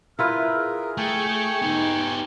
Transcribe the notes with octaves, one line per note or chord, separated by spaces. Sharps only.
E4 F4 A#4 B4 F6
G#4
A3 G5 G#5 C#6
B3 D#4 G4